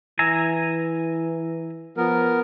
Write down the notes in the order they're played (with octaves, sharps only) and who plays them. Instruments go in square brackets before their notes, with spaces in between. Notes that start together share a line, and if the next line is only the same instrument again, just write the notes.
[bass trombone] E3 [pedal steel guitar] E5 G#5 A#5
[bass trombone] F3 [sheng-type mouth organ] B3 A#4